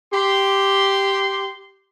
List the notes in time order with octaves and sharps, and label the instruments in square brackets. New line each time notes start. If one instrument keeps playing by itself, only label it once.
[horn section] G4 C6